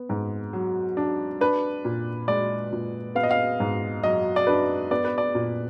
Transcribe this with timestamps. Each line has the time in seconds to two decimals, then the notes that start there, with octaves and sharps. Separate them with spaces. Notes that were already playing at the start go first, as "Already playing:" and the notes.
Already playing: B3
0.09 G#2
0.53 F#3
0.97 D4
1.41 D4 B4
1.85 A#2
2.28 G#3 D5
2.73 A#2
3.15 B3 F5
3.23 D#5
3.31 F5
3.60 G#2
4.03 F#3 D#5
4.36 D5
4.47 D4 B4
4.91 B3 D5
5.05 B4
5.18 D5
5.35 A#2